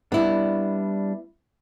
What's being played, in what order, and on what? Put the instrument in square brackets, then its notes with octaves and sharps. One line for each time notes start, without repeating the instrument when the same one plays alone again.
[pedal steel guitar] G3 D4 [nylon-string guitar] B3 E4